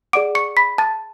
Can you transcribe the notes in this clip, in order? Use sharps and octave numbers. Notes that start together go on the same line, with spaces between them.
G#4 D5 F#5 D6 D7
C#6 C#7
B5 B6
A5 A6